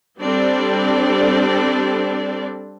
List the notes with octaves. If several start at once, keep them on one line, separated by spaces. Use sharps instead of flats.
G3 C4 D4 A4 D5